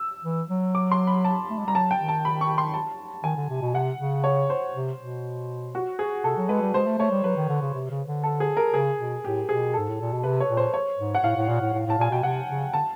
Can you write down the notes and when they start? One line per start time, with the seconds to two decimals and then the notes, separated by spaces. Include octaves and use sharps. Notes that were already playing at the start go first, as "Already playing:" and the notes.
Already playing: E6
0.25 E3
0.50 F#3
0.75 D6
0.92 C6
1.07 B5
1.25 A5
1.50 A3
1.59 G#3
1.66 G3 A#5
1.75 F#3 A5
1.91 G5
1.99 D#3
2.08 A5
2.25 B5
2.41 C#6
2.58 C6
2.74 A5
3.24 D#3 G#5
3.37 D3
3.49 C3
3.62 B2
3.74 C3 F#5
3.99 C#3
4.24 C#5
4.50 C5
4.74 C3
5.00 B2
5.75 F#4
5.99 G#4
6.24 C3 A4
6.37 F#3
6.49 G#3 B4
6.62 G3
6.74 G#3 C5
6.86 A3
6.98 A3 C#5
7.11 G3
7.24 F#3 B4
7.37 D#3
7.49 D3
7.62 C#3
7.74 C3
7.90 C#3
8.07 D3
8.23 A4
8.40 G#4
8.57 A#4
8.74 C#3 G#4
8.99 B2
9.24 A2 G4
9.49 B2 G#4
9.74 G#2 A4
9.89 A2
10.01 A#2
10.13 B2
10.23 C3 B4
10.40 C#5
10.49 A#2
10.57 C5
10.74 C#5
10.98 G#2
11.15 F#5
11.24 A2 F5
11.36 A2
11.48 A#2
11.61 A2
11.73 A2
11.86 A2
11.90 A5
11.98 A#2 G#5
12.11 B2 G5
12.23 C3 F#5
12.48 C#3
12.73 D3 A5